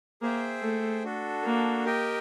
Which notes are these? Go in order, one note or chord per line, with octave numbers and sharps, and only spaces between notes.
A#3 G#4 C5 E5 G5
A3
D4 F#4 A4
A#3
G4 A#4 D#5 G5